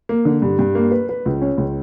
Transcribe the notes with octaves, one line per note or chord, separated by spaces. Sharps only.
A#3
D3
G2
G2
A#3
B4
B4
C#2
C#4
C#2